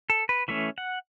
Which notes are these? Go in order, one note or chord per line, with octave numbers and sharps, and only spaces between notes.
A4
B4
E3 A3 C#4 E5
F#5